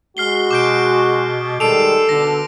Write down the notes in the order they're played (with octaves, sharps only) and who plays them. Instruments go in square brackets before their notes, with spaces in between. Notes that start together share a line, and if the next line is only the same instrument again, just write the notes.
[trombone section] G#3 F#4 [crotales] F6 C7 G7
[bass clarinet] B2 [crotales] D6 G6 D7
[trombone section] D#3 G3 G#3 [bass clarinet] A4 [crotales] C7 D7 F7
[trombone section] B2 D3 [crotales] A#6